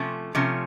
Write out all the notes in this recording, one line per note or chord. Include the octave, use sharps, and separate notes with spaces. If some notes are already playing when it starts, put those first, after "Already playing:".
Already playing: C3 F3 A3 C#4
C3 F3 A3 C#4